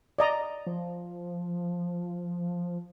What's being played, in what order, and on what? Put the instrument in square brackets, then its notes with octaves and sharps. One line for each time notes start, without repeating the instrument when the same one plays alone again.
[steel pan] D5 D#5 A#5
[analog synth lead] F3